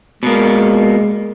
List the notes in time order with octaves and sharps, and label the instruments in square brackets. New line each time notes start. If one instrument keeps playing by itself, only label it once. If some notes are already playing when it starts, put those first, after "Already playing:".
[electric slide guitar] B2 A#3 [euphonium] G#3